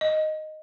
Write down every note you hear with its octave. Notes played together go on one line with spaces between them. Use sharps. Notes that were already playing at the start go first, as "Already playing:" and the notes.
D#5